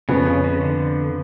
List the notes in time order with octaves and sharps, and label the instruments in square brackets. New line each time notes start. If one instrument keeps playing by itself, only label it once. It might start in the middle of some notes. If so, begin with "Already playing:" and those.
[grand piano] F1 F2 F3 B3 [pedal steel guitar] C#3
[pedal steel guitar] C#3
C#3
D3